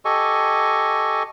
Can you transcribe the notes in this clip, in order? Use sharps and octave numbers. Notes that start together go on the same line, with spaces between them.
G4 A4 D#5 G#5 C#6